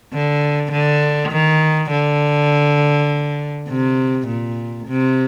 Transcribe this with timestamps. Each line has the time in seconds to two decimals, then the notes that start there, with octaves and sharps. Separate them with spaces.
0.13 D3
0.72 D3
1.32 D#3
1.91 D3
3.69 C3
4.27 A#2
4.87 C3